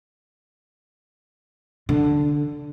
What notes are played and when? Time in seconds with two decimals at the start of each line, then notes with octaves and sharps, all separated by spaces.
1.89 D3